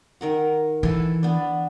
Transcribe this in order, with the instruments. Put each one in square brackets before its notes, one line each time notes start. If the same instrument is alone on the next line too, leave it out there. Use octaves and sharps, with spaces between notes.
[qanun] D#3 A#4 F#5
[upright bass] E3 [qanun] A4 G#5
[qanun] B3 D4